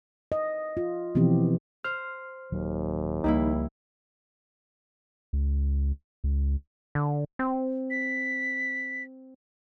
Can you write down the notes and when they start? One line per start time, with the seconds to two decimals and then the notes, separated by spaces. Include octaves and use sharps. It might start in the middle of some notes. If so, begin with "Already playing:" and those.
0.32 D#5
0.77 F4
1.15 B2 E3 F3 B3 C4 G4
1.84 C5 F6
2.52 D#1 D#2 D#3 F#3
3.24 C#2 F3 G3 A#3 D#4 E4
5.33 C#2
6.24 C#2
6.95 D3
7.39 C4
7.90 B6